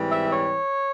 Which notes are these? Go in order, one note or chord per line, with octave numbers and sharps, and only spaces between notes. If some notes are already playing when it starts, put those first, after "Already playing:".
Already playing: G#2 E3 G3 C4
E5
C#5